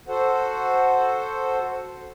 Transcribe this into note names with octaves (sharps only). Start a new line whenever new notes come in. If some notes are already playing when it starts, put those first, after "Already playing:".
F#4 A4 C5 F#5